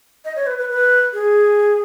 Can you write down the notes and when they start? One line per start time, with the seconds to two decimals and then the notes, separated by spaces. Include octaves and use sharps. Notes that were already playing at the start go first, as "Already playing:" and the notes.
0.25 D#5
0.36 C#5
0.47 B4
0.58 B4
0.69 B4
1.13 G#4